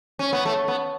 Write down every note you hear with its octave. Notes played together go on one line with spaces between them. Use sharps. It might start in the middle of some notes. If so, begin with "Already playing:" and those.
C#4
B3
A3
B3